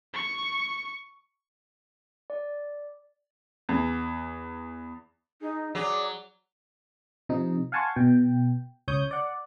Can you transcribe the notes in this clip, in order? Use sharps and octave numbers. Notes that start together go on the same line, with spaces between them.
C#6
D5
E2
D#4 G#4
F#3 G#4 D5 D6
C3 F3 D#4
F5 F#5 G#5 A5 C6 C#6
B2 G5
C#2 C#5 D#6 G6
D5 F#5